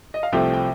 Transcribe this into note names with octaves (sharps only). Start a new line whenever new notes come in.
D#5
F5
C2 C3 F3 A3 C4 G5
G5